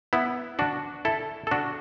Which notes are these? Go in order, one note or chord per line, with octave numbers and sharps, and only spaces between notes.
B3 E4
D4 F#4
E4 A4
A4
D4 F#4